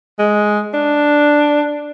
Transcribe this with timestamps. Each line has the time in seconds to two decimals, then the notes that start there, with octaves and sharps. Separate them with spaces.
0.19 G#3
0.74 D4